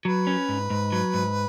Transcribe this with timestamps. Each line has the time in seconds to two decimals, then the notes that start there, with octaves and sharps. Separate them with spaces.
0.05 F#3 B4
0.27 C#4
0.49 G#2
0.70 G#2
0.92 F#3
1.14 G#2